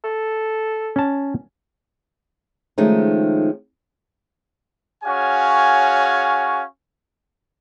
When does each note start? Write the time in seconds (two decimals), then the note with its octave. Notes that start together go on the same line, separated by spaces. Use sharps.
0.04 A4
0.96 C#4 A5
2.78 D#3 F3 G#3 A3 C#4 D#4
5.04 C#4 F#4 G#4 C#5 F5 G#5